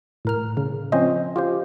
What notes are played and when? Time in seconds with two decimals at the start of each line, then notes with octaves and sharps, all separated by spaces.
0.25 A2 A#4 F6
0.57 C#3
0.92 F3 C4 C#4 C5 D#5
1.36 F4 G4 C5